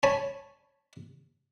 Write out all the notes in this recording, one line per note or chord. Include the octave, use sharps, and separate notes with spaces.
C#5 G#5 A5 B5